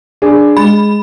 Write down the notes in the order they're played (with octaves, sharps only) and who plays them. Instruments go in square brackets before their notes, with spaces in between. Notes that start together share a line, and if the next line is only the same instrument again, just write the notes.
[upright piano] D4 G#4
[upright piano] G#3 [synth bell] B5